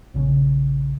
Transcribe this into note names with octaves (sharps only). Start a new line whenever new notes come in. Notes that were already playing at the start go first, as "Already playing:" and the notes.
A#1 C#3